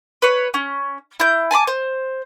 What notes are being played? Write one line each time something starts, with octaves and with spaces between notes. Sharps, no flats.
B4 C#5
C#4
E4 G6
G#5 A5 B5 D6
C5